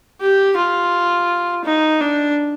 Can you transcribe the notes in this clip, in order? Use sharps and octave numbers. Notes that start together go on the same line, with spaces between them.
G4
F4
D#4
D4